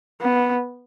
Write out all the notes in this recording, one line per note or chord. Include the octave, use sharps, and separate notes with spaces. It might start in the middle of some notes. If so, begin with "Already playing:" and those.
B3